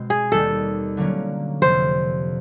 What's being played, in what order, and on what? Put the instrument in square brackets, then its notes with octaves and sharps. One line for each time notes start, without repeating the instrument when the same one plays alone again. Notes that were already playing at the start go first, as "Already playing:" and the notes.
Already playing: [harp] B2 G#3 C4
[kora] G#4
[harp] D#2 D#3 G3 [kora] A4
[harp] D3 F#3 A#3 C#4
[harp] F2 C3 F3 [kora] C5